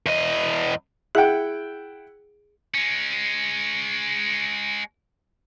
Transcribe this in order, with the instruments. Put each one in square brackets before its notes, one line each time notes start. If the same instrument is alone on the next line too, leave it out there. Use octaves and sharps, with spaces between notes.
[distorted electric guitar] E2 D#5
[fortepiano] E4 F#5 G5 [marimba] G#4
[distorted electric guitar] G#3 C#4